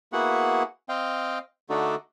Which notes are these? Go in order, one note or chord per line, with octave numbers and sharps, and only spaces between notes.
A#3 B3 E4 F#4 G#4 F#5
C4 D#5 F5 G5
D3 A3 D4 D#4 F#4 A4